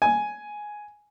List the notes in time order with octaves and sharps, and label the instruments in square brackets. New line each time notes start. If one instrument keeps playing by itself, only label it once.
[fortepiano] G#5